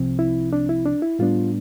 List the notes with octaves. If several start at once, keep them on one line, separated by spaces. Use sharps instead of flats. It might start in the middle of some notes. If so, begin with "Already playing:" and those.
Already playing: C2 C3 F3 C4
E4
D4
E4
D4
E4
A2 G3 B3 D4 F4